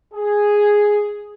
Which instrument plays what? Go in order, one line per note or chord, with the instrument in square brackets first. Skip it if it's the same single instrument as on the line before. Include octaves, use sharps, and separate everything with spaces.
[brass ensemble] G#4